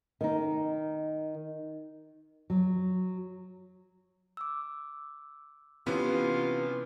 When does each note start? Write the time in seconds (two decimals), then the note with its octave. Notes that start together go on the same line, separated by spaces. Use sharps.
0.21 D#3 D#4
2.50 F#3
4.37 D6 E6
5.86 C3 E3 B3 C#4 F4